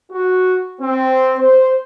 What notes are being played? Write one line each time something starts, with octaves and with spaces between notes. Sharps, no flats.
F#4
C4
C5